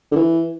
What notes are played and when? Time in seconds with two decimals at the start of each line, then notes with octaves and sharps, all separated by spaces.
0.12 D3
0.16 E3